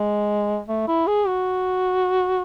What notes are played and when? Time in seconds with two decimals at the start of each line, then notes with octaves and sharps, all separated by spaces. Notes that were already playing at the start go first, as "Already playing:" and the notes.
Already playing: G#3
0.68 A3
0.88 E4
1.07 G#4
1.27 F#4